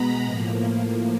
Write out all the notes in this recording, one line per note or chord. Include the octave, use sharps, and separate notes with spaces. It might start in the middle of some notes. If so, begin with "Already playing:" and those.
Already playing: B2 G#3 B3 A#5 B5
A2 F3 A#3